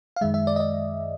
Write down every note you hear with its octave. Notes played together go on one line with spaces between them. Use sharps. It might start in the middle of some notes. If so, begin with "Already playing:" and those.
F5
F#2 D#3 G#3 E5
E5
D5
D#5
D5